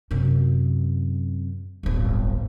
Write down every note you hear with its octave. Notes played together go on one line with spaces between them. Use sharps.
F#2 C3
D1 G1